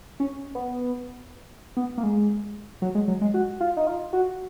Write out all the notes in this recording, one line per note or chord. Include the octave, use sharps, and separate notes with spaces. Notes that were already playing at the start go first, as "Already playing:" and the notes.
C#4
B3
B3
A#3
G#3
F#3
G#3
F#3
G#3
F#4
F4
D#4
F4
F#4